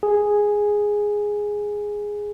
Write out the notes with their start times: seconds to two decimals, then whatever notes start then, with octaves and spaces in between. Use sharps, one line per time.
0.03 G#4